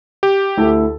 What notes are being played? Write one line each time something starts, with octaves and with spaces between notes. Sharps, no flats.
G4
D2 E4 A4